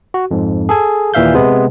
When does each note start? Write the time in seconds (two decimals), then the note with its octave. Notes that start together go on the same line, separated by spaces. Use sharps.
0.14 F#4
0.31 F2 G#2
0.69 G#4 A4 G#5
1.14 D#2 A#2 E3 E5 F5 G6
1.34 C3 G#3 B3